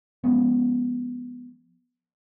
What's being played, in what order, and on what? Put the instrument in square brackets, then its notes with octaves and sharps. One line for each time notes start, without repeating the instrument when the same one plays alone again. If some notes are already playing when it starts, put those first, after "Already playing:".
[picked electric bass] F3 G#3 B3 C#4